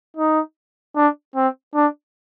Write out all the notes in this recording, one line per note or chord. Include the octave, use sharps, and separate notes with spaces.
D#4
D4
C4
D4